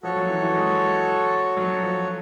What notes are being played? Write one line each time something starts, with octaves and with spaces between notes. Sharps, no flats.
F3 F#4 A4 C#5
F#3
E3
E3
G#3
F#3
F3